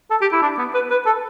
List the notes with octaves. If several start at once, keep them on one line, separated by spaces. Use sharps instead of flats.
A4
G4
E4
D4
B3
B4
B4
A4